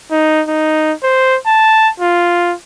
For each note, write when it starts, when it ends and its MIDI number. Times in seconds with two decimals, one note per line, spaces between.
0.11 0.42 63
0.48 0.93 63
1.03 1.37 72
1.46 1.89 81
2.00 2.54 65